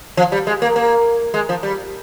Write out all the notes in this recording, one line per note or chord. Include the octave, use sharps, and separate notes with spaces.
F3
G3
G#3
A#3
A#3
G#3
F3
G3